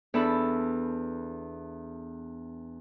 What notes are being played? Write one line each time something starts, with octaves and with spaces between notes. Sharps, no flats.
E2 D4 A4 B5